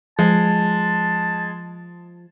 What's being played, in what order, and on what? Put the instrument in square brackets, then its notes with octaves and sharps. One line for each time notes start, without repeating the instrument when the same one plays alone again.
[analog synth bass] F3 [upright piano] G#3 [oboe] A5